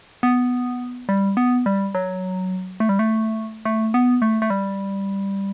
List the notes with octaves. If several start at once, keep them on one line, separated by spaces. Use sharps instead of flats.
B3
G3
B3
G3
F#3
A3
G3
A3
A3
B3
A3
A3
G3